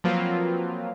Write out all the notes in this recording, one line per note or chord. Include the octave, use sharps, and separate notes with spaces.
F3 F#3 A#3 C4 F4 B4